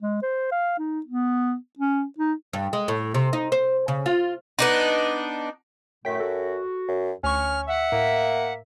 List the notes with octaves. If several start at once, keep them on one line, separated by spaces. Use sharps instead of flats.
G#3
C5
F5
D#4
B3
C#4
D#4
G2
G#3
A2
C3
D#4
C5
C#3
F4
B3 D4 D#4
F#2 A2 D3 A3 G5 B6
F#4 A4
F#2
D2 C#4 C#6 F6
E5 F#5
A2 A#3